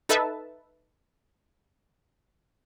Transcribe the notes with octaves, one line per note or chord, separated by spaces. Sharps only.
D#4 A4 B4 E5 A5